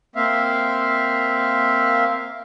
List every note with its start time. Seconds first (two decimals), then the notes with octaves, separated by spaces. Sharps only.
0.16 A#3 C4 E5 F5